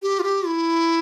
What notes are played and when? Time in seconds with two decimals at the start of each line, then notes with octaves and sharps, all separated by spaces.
0.02 G4
0.19 F4
0.23 G4
0.46 E4